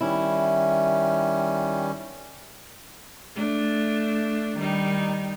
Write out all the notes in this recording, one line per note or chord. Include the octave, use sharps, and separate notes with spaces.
D#3 G3 C#4 E4
A3 D4
D#3 G3 D#4